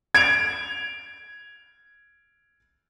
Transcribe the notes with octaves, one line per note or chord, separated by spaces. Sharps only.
G#6 D7 F7